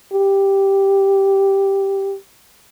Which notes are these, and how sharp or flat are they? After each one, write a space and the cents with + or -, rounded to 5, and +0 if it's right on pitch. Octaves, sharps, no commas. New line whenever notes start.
G4 +0